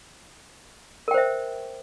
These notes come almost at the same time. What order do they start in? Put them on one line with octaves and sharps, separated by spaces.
A#4 G5 C5 E5